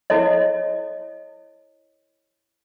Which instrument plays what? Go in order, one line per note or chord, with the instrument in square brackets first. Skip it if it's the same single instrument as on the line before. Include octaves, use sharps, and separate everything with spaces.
[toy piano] E4 A4 C#5 D#5